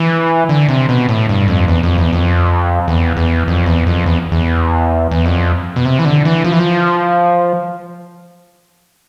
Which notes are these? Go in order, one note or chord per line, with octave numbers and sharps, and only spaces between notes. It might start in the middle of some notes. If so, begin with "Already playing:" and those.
Already playing: E3
D3
C3
B2
A2
G2
F2
E2
F2
E2
F2
E2
E2
F2
E2
F2
E2
E2
E2
F2
B2
C3
E3
D3
E3
F3
E3
F3